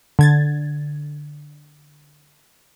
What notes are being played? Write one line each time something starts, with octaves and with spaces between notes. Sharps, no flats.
D3 G#6 A6